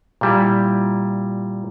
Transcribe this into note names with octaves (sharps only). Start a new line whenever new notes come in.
A#2 G3 E4